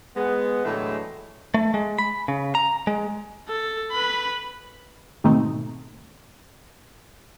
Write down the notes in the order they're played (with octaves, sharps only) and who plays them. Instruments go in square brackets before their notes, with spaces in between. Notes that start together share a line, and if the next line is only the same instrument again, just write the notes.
[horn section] G#3 B3
A2 D3 E3 F#3 G#3 A3
[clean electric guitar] A3
G#3
B5
C#3
A#5
G#3
[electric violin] A4
B4 B5
[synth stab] G#2 B2 D#3 A3 C4 D#4